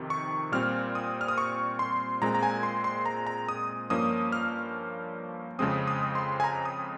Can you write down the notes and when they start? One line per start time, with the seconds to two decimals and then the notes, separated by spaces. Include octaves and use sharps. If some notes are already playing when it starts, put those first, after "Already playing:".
Already playing: F2 C3 D#3
0.10 C#6
0.52 A#2 G3 C4 F6
0.95 D#6
1.21 F6
1.28 D#6
1.38 C#6
1.79 C6
2.22 A#2 G#3 C4 A#5
2.35 A#5
2.43 G#5
2.63 C6
2.84 C6
3.06 A#5
3.27 A#5
3.49 D#6
3.90 G2 F3 A#3 C#4 D#6
4.32 F6
5.59 F2 C#3 G#3 C4 D#6
5.87 D#6
6.15 C6
6.40 G#5
6.44 A#5
6.65 D#6